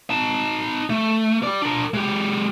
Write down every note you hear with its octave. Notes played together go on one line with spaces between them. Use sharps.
D#4 A5
A3
G4 D5
D4 A#4
G#3 G4